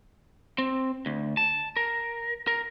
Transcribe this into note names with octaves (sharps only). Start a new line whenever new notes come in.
C4
D2
A5
A#4
A#4